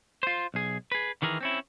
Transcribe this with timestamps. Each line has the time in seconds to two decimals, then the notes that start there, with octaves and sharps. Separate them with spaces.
0.23 F4 C5
0.54 B1 G#4
0.92 G#4 B4
1.22 D#3 E3 G#4 A#4
1.41 C4 C#4 E4